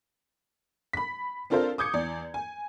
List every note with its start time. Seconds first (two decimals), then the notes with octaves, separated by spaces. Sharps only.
0.93 B5 B6
1.50 C4 D4 F4 A4 A#4 C5
1.78 D6 D#6 G6 G#6 C#7
1.93 E2 D5
2.34 G#5